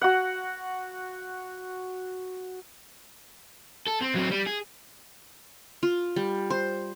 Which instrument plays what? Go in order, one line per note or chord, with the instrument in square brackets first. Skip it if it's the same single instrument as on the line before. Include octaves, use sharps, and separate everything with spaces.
[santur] F#4 F#5
[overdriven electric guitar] A4
C4
F#3 C4
G3
G#4
[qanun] F4
G3
C5